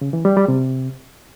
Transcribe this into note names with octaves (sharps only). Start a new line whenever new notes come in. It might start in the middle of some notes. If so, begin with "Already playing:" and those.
C#3
E3
G3
G3
C3